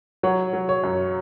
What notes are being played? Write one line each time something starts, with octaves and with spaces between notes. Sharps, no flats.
F#3 C#5 F#5
F#3
C#5
F#2